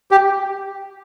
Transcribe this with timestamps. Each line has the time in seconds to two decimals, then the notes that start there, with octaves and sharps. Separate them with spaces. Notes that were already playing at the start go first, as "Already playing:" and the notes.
0.11 G4